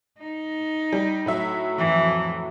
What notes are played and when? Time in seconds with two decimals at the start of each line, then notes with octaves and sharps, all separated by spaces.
0.18 D#4
0.93 G3
1.26 A2 F#3 E5
1.78 F2 E3